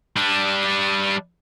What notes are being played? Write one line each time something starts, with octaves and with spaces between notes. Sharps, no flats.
G3 D4